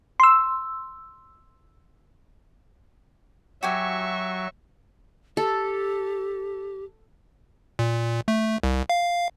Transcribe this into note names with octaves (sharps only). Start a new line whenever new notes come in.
C6 E6
F#3 F#4 G4 E5 G#5 C#6
G4 A4
A#2
A3
C2
F5